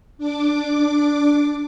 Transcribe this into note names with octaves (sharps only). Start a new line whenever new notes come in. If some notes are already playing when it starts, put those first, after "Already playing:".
D4 D6